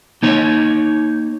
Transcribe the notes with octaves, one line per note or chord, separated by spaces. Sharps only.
A#3 D#4 C#5